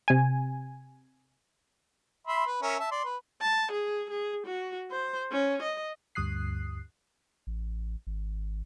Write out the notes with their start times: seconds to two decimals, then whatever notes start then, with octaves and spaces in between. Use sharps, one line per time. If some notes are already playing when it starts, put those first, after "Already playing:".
0.08 C3 G#5
2.27 E5 B5 C6
2.47 B4
2.62 C#4 A#4 E5
2.79 E5 A5
2.91 D5 C6
3.05 B4
3.41 A5
3.72 G#4
4.11 G#4
4.46 F#4
4.91 C5
5.32 C#4
5.62 D#5
6.15 D2 G2 D#6 F#6 C7
7.47 A1
8.07 G#1